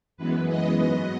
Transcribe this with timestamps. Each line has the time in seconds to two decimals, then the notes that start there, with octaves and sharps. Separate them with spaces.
0.17 F#2 E3 G#3 B3 B4
0.48 D#5
0.80 G#2 F#3 B3